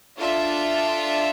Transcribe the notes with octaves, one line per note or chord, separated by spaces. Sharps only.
D4 F4 A4 E5